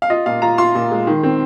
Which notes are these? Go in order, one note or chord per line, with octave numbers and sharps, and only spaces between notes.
F5
F4 D#5
A#2 F5
F4 A#5
F4 C6
A#2
G#3
D#3
C4